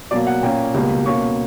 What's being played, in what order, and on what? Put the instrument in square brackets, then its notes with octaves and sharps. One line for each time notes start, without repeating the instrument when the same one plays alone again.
[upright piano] B2 F#3 A#3 D5
F#5
A#2 A#3 C#4 G5
C#2 B2 G3 A#3
B2 A#3 C#4 C#6